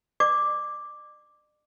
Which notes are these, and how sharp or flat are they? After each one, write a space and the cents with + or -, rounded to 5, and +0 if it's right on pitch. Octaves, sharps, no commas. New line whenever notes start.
D5 +40 D6 +0